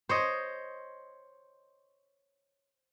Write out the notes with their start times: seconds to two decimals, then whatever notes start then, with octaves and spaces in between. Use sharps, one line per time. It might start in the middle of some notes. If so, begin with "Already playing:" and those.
0.09 C5 C#5 D#5